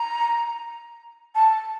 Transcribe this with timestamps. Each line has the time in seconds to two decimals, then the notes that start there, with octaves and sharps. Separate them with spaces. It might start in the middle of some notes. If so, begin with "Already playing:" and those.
Already playing: A#5
1.35 A5